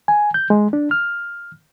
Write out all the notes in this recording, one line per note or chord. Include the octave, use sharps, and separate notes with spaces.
G#5
G6
G#3
D4
F6